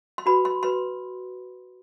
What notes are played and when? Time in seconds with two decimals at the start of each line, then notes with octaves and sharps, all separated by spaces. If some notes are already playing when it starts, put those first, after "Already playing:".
0.18 C6
0.26 F#4 B4 B5
0.45 C6
0.63 F#4 B4 C6